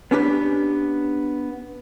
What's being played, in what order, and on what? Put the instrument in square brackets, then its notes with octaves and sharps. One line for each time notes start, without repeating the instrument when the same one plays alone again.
[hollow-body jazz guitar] B3 C#4 D4 G4 B4